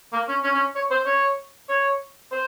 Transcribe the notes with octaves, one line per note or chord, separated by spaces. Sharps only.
A#3
C#4
C#4
C#4
C#5
C5
C#5
C#5
C5